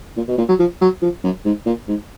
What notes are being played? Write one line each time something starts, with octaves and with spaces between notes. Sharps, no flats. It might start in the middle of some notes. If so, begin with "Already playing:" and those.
A#2
B2
A#2
F#3
F3
F#3
F3
F#2
G#2
A#2
G#2